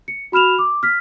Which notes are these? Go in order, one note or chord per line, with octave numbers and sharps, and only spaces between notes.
C#7
F#4 B5 F6 E7 F7
D6
F6 B6